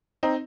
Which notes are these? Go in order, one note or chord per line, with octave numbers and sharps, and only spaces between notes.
C4 D#4